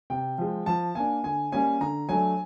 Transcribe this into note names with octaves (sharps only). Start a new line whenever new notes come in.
C3 G5
F3 G#3
F3 A5
A#3 D4 G#5
D3 G#5
G3 A#3 C#4 G#5
D3 A#5
F#3 A3 D4 G#5